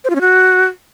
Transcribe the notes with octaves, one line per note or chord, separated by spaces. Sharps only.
C5
F4
C#4
F#4